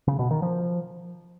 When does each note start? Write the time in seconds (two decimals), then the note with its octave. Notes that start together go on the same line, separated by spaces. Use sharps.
0.07 C#3
0.19 B2
0.31 D#3
0.42 F3